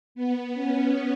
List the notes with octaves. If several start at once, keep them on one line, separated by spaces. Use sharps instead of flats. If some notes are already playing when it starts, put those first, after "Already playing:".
B3
C#4